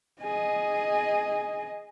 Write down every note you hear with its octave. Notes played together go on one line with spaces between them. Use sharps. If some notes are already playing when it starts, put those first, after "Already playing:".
G#4 D#5